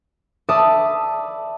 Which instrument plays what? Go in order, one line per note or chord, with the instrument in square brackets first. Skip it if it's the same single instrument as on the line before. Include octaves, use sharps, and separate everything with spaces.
[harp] D5 E5 A5 B5 D#6